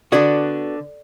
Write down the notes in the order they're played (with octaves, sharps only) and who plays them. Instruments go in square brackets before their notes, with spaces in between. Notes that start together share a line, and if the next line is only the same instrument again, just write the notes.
[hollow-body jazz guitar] D3 B3 D4 F#4 [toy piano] A4 D5